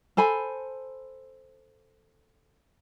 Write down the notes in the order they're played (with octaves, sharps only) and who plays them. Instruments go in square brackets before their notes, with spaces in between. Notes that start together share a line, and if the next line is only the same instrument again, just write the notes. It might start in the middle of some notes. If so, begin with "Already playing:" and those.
[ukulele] A4 C5 G#5 B5